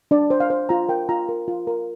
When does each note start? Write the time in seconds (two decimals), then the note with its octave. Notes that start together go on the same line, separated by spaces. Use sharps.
0.11 D4 D5
0.30 C5
0.40 F5
0.50 C5
0.69 F4 A#5
0.89 A#4 G5
1.09 F4 A#5
1.29 A#4
1.48 F4
1.67 A#4